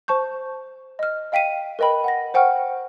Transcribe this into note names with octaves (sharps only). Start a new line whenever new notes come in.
C5 A5 C#6 G6
D#5 F6
D#5 F5 G5 B6 C7 D#7
A#4 B4 D#5 G5 B5
F#5 A#6
C5 F#5 G5 C#6 F6